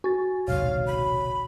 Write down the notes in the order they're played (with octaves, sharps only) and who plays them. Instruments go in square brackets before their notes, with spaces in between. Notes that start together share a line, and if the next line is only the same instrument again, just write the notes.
[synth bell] F#4 [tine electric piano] G#5 A6
[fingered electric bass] D#1 B1 G#2 [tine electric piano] C3 C#5 [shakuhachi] F5
[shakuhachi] B5